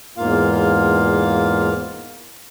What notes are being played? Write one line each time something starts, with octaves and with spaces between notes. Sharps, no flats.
E2 G#2 A#3 F4 F5